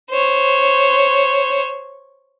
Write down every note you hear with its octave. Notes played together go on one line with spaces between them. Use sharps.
C5 C#5